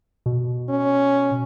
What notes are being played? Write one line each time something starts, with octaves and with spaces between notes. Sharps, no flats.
B2
C#4